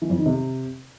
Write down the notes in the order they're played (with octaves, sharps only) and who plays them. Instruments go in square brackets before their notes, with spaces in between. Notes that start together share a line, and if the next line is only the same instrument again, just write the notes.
[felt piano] E3
F2
D#3
C3